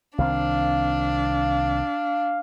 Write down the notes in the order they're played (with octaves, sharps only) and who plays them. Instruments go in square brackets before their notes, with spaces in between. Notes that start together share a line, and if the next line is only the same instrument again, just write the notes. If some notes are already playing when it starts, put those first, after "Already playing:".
[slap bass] C2 D#3 C4 [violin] D4 [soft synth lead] F5